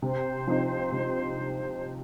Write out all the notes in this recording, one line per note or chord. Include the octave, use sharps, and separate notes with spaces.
C3 C5
F3 C4 D#4
C3